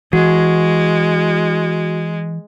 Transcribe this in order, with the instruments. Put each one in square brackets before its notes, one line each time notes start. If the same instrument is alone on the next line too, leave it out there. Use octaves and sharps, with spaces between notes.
[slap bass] E3 [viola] G#3 [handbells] F#4